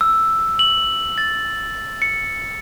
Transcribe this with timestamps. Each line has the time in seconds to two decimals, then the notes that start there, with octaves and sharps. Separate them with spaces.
0.01 E6
0.59 F#7
1.18 A6
2.02 C#7